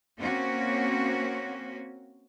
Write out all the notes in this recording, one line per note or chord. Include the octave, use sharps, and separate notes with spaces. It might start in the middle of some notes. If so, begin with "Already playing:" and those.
A#3 C4 C#4 F#4